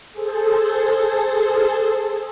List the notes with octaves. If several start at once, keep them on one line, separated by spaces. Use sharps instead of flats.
G#4 A4 C5